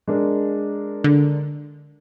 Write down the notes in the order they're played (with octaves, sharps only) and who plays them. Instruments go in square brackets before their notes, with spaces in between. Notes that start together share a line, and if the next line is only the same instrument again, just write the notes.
[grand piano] G#3 D4 A#4
[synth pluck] D3